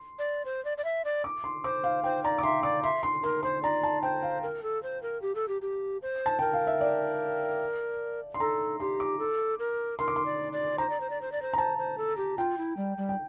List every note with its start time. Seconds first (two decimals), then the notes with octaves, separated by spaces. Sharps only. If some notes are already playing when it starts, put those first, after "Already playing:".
Already playing: C6
0.19 D5
0.45 C5
0.65 D5
0.78 D5
0.84 E5
1.05 D5
1.24 D6
1.44 C6
1.64 C5 D6
1.84 F5
2.04 C5 G5
2.24 D5 A#5
2.38 D6
2.43 E5 C6
2.63 D5 D6
2.83 E5 C6
3.03 C6
3.23 A#4 C6
3.43 C5 C6
3.63 D5 A#5
3.83 A5
4.03 C5 G5
4.23 F5
4.43 A#4
4.63 A4
4.83 C5
5.03 A#4
5.22 G4
5.35 A4
5.48 G4
5.62 G4
6.02 C5
6.26 A5
6.39 A#4 G5
6.53 F5
6.67 E5
6.81 D5
8.34 C6
8.40 A4 A#5
8.80 G4 C6
9.00 D6
9.19 A4
9.59 A#4
9.99 A#4 C6
10.08 D6
10.16 C6
10.26 D5
10.53 D5
10.78 C5 A#5
10.90 D5
11.00 C5
11.10 D5
11.21 C5
11.32 D5
11.42 C5
11.53 A#5
11.58 C5 A5
11.78 C5
11.98 A4
12.17 G4
12.38 F4 G5
12.58 E4
12.77 G3
12.98 G3
13.09 G5